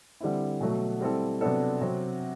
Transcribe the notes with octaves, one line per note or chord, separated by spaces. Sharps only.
D3 G3 C4 E4
B2 F#3 A3
G3 C4 E4 A4
C3 F#3 B3 D4 A4
C3 F#3 C4